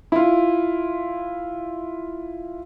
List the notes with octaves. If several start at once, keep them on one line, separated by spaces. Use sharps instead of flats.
E4 F4